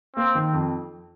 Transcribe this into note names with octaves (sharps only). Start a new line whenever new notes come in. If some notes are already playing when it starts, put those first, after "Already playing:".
A#3 C4
D#3
F2